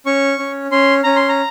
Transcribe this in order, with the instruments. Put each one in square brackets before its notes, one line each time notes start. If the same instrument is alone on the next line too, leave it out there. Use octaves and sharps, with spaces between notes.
[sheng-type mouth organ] C#4 C#6
C#4
C#4 C6
C#4 A#5
C6
A#5